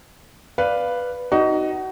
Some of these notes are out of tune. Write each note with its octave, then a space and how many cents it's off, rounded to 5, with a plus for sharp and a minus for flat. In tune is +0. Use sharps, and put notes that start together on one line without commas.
B4 +0 D5 +0 F5 +0
D#4 +0 F#4 +30